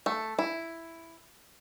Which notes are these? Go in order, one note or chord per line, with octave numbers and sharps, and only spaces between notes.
A3
E4